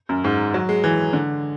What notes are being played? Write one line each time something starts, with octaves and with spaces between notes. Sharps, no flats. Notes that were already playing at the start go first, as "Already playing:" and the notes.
F#2
G#2
F#3
G#3
E3
D3